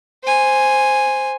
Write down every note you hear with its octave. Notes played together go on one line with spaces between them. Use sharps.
C5 G#5